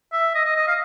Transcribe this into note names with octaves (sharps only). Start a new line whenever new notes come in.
E5
D#5
D#5
D#5
F5